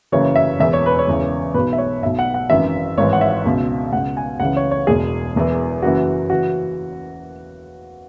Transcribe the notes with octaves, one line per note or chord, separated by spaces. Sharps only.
F#1 F#2 C#3 E3 C#5
E5
E1 E2 E3 E5
C#5
B4
C#5
E1 E2 C#3 E3
B1 B2 B4
E5
C#5
B1 B2 E5
F#5
F#5
G#1 F#2 E3 E5
G#1 G#2 E3 C#5
F#5
E5
C#2 B2
C#2 B2 F#5
G#5
C#2 C#3 E3 F#5
C#5
C#5
E1 E2 B2 G#4
E1 E2 E3
F#1 F#2 E3 F#4
C#3 E3 F#4